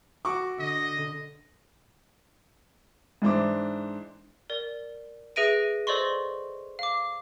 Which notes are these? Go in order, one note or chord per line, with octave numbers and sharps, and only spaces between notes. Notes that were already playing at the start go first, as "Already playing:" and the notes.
F#4 C#6 D6
D3 D#5
G#2 E3 D4 C5 E5 D6
A#4 D5
G#4 B4 E5 A#6 D7 D#7
A4 C5 D5 D#5 C6 C#6
F5 D6